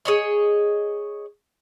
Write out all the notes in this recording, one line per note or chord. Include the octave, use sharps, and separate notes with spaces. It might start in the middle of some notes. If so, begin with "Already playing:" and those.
G#4 C#5 D#5